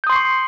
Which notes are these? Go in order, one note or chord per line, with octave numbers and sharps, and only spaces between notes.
C6 C#6 D#6 G6 C7